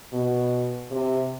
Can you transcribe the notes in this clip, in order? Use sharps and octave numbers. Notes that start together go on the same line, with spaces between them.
B2
C3